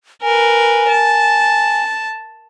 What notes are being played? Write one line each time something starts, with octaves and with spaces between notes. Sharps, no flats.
A#4 B4 G#5
A5